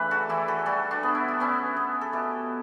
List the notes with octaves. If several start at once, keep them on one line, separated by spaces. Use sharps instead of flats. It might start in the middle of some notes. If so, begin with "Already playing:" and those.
Already playing: C#3 E3 A3 D4 B4
F#4 A4
E3 E4 G4
F#4 A4
G3 F#4 A4
D4 F#4
B3
E4
F#4
B3 C#4 E4
B3
A4
B2 E4 G4